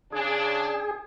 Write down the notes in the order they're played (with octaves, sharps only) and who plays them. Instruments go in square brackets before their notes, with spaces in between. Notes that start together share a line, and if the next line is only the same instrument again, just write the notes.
[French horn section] C#3 D4 [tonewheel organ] G#4